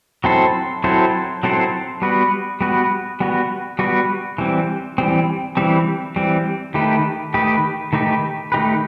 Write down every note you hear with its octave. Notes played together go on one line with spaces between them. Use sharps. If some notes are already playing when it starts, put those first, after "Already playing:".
F#3 C4 E4 A4 C5
F#3 C4 E4 A4 C5
F#3 C4 E4 A4 C5
G3 B3 F#4 B4
G3 B3 F#4 B4
G3 B3 F#4 B4
G3 B3 F#4 B4
E3 G3 C4
E3 G3 C4
E3 G3 C4
E3 G3 C4
D#3 A3 D#4 G4 B4
D#3 A3 D#4 G4 B4
D#3 A3 D#4 G4 B4
D#3 A3 D#4 G4 B4